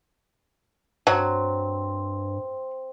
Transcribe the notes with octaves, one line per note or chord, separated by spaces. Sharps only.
G2 F#3 C4